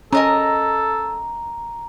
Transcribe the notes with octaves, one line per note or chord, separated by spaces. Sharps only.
C#4 A4 A#4 D#5 A#5 D#6